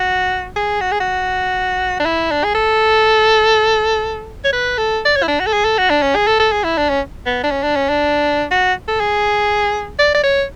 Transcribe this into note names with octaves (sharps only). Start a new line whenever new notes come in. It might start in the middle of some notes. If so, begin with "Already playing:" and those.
Already playing: F#4
G#4
F#4
G#4
F#4
D4
E4
D4
G#4
A4
C#5
B4
A4
D5
C#5
E4
D4
F#4
A4
G#4
A4
F#4
D4
C#4
G#4
A4
A4
G#4
E4
D4
C#4
B3
D4
C#4
D4
C#4
D4
F#4
A4
G#4
D5
D5
C#5